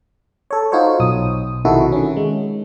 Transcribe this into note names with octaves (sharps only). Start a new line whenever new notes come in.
A4 C#5
D#4 F4 F#4 C5 C#5
B1 D#6
C3 D#3 D#4 E4 F#4 A4
D#3 C#4
G#3